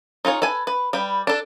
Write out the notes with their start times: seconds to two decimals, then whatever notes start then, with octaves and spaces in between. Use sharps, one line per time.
0.25 D#4 F4 G#4 C#5
0.42 A4 B4 G#5
0.67 B4
0.93 G3 B4 G5
1.27 D4 A4